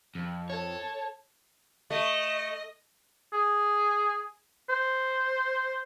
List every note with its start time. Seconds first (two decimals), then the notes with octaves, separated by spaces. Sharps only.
0.15 F2
0.50 A4 C#5 A5
1.90 A3 D#5
3.33 G#4
4.69 C5